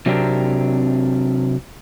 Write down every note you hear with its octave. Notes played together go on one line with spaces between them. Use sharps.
C3 F#3 C4 D4 G4 A#4